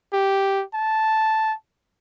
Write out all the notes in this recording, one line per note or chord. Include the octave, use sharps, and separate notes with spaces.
G4
A5